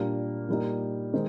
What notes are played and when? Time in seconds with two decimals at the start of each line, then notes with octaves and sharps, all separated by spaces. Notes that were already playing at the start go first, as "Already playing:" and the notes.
Already playing: A#2 G3 A#3 D4 G4
0.48 A#2 G3 A#3 D#4
1.13 D#3 G#3 C4 D#4